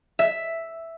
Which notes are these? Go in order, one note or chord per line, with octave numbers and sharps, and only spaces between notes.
E5